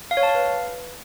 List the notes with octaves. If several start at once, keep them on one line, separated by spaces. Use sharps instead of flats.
F5
C#5
A5
F5
B4